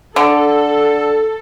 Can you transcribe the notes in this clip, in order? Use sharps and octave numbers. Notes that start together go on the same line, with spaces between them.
D3 A4